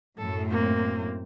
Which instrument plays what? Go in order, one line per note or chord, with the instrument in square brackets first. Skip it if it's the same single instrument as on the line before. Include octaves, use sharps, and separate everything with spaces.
[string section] F#2 A2 [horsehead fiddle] A4
[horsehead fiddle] A#3 C4